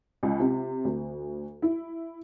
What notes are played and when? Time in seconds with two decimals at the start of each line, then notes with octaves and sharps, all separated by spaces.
0.23 C#2
0.40 C3
0.85 D2
1.62 E4